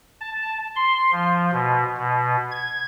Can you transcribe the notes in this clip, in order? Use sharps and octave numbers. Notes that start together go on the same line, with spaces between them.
A5
C6
F3
B2
B2
G#6